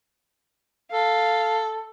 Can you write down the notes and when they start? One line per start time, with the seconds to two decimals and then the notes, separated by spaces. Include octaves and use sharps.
0.92 A4 F5